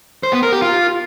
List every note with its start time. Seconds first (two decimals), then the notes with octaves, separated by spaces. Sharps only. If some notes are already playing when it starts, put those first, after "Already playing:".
0.23 C5
0.33 B3
0.43 A#4
0.52 G4
0.62 F4